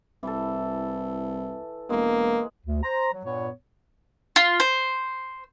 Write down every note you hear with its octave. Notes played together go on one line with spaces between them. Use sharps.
C2 E3 A4
E1 G#3 A#3
D2
C5 A#5
F#3
G2 A#2 B3 C#5
F4
C5